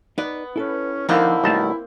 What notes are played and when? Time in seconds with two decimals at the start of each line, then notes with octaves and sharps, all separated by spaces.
0.18 B3 D#4 B4 D5
0.56 C#4 E4 A4 B4
1.09 D3 D#3 F3 A#3 C4 D#4 E4 F#5
1.44 B1 D#3 G3 A3 A5